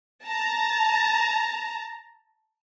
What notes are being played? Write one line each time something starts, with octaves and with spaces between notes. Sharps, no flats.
A5 A#5